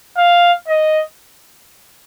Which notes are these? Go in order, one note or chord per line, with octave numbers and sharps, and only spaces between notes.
F5
D#5